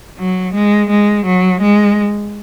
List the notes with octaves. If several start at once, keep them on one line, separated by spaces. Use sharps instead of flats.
F#3
G#3
G#3
F#3
G#3